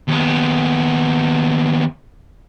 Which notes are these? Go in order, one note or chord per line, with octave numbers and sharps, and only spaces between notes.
D#2 B3